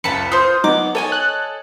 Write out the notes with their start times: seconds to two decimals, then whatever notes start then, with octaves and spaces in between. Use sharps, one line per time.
0.04 F#1 C#2 A5 B5 C#7
0.32 F4 C5 D#6
0.64 F#3 B3 D#4 D6
0.95 A4 C#5 D#5 G#5
1.12 F#6